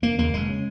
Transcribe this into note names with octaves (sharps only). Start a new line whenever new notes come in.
F1 A#3
D#2 C#3 A#3
F1 G#3
C#3